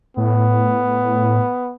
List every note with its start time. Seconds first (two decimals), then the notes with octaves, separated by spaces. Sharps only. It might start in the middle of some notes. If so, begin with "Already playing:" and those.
0.17 A2 B3